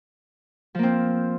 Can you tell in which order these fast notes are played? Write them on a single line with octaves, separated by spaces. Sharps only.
F3 A#3 C4